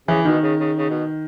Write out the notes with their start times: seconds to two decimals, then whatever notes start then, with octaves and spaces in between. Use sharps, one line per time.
0.08 C#3 E3
0.25 B2 D#3
0.42 C#3
0.60 C#3
0.77 C#3
0.90 B2